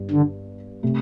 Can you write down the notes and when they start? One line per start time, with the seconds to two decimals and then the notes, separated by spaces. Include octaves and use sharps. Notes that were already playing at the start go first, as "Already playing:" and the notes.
Already playing: G1 G2 G3
0.11 D3
0.83 C3 A3